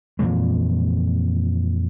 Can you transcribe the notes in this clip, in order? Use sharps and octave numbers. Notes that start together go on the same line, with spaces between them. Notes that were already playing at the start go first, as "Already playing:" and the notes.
F2 A#2 E3 G#3